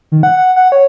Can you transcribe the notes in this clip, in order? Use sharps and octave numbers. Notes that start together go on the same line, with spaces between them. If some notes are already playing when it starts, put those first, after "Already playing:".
D#3
F#5
F#5
F#5
C#5